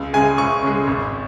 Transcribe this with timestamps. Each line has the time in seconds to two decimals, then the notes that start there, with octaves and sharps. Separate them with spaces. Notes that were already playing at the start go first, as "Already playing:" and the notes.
Already playing: C#2
0.14 C#3 G#3 G#5
0.38 C#2 C#6
0.63 C#3 G#3
0.87 G#1